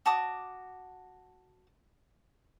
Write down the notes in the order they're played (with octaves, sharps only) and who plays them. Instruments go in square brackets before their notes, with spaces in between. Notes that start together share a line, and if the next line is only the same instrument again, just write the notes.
[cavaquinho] F#4 A5 D6 D#6